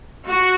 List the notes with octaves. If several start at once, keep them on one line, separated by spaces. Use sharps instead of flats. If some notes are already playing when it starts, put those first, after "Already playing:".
F#4